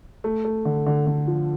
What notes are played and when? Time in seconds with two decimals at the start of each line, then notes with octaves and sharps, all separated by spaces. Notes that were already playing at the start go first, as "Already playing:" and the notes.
0.24 A3
0.45 A3
0.65 D3
0.86 D3
1.07 D3
1.28 F3